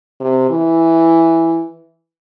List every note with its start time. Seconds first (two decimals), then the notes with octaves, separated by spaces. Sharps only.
0.21 C3
0.50 E3